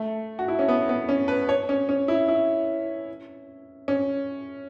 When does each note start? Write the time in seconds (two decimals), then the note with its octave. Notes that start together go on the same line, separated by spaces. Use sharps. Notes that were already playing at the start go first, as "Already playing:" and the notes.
Already playing: A3
0.39 F#4
0.48 E4
0.59 C#4
0.68 B3
0.89 B3
1.09 C#4
1.28 B4
1.49 C#5
1.69 C#4
1.89 C#4
2.08 E4
2.28 E4
3.88 C#4